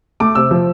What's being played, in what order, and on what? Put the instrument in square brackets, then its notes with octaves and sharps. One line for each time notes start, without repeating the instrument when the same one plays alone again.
[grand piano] A3 D6
C3 E6
F3